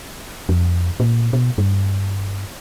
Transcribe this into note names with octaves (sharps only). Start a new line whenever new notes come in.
F2
A#2
B2
G2